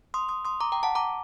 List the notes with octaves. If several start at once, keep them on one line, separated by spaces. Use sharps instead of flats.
C6 D#6
C6 D#6
C6 D#6
A#5 D6
G5 A#5
F#5 A5
A#5 D6